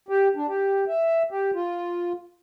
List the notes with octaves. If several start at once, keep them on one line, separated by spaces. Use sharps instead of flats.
G4
D4
G4
E5
G4
F4